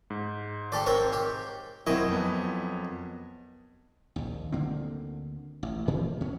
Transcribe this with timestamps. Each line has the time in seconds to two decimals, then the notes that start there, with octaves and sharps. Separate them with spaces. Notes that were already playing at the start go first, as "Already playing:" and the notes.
0.10 G#2
0.72 G4 A4 D5
0.86 C4 A#4 C#5
1.13 G4
1.87 F#2 C4 E4 D#5
2.08 F2 B3
4.16 A#1 D#2
4.52 D2 D3 A#3 C4
5.63 A1
5.88 A2 E3 F3 A#3
6.20 D#2 B2 C#4